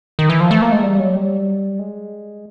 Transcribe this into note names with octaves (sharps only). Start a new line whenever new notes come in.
D#3
E3
F3
A3
A#3
G#3
G3
F#3
G3
G#3